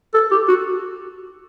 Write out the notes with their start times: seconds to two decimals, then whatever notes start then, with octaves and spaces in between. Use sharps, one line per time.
0.14 A4
0.31 G4
0.48 F#4